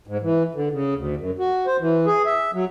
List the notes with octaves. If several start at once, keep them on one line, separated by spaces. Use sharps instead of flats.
G#2
E3
D3
C#3
D2
F#2
F#4
C5
E3
G#4
E5
F#3